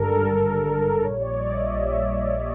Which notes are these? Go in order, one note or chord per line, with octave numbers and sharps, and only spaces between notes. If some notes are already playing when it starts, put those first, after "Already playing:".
Already playing: G#1 G2 D3 G3 A4 A#4
G#1 G2 D3 G3
A#1 A#2 G3 C#5
D5
D#5
E5
A#1 A#2 G3